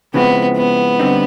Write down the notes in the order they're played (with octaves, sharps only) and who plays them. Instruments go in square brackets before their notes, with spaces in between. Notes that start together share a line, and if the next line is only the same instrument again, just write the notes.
[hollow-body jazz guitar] C#3 F3 G#3 C4 E4 [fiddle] B3
[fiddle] B3
[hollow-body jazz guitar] D3 G3 C4 D#4